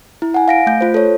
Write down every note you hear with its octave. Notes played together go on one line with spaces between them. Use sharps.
E4
F#5 G#5
F5 A#6 D7
A3 G6
F4 C5
A4 C#5